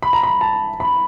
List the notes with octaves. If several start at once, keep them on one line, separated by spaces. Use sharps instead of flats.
B5
A#5
B5
A5
B5